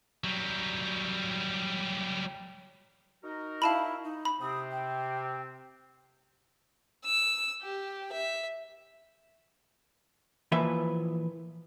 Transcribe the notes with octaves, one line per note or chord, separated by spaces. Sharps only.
F#3 G3
D#4 F#4 A#4
E4 F5 A5 B5
D#4
B5
C3 C4 D#6
G5
E6
G4
E5
A#2 E3 F3 B4 E5